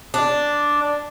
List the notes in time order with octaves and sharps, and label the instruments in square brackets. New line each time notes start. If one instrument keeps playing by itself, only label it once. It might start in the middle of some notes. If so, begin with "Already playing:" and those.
[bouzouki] D4